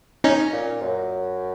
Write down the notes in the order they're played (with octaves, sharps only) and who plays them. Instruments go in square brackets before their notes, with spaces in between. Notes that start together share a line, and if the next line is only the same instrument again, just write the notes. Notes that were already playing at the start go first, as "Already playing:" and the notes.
[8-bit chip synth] C#4 D#4
[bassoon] A#2
F#2